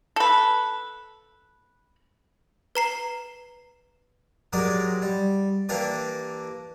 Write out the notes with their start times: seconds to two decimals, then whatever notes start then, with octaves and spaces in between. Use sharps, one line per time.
0.16 A4 B4
2.75 B4 A#5 C7
4.53 F#3 G#3 G4 A#4 D5
5.02 G3
5.69 E3 A#3 D4 G4 A#4 D5